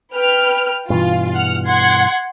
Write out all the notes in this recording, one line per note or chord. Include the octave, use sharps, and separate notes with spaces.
B4 G5 F6
G2 B2 E3 F4
F#5 F6
F#5 C6 G#6